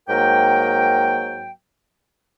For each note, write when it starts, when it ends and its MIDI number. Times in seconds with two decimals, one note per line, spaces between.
0.09 1.52 44
0.09 1.52 54
0.09 1.52 58
0.09 1.52 70
0.09 1.52 79